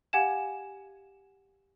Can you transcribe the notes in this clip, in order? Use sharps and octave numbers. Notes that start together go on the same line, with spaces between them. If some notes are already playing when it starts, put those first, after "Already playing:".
G4 F5 F#5 G#5 G#6 E7